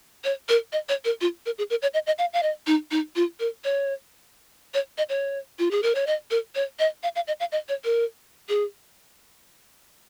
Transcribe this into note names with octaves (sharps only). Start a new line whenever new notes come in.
C#5
A#4
D#5
C#5
A#4
F4
A#4
G#4
A#4
C#5
D#5
D#5
F5
F5
D#5
D#4
D#4
F4
A#4
C#5
C#5
D#5
C#5
F4
G#4
A#4
C#5
D#5
A#4
C#5
D#5
F5
F5
D#5
F5
D#5
C#5
A#4
G#4